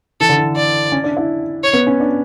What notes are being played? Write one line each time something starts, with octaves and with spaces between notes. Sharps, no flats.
E3 A4
D3
E3
D5
C#4
D4
E4
C#5
B3
C#4
D4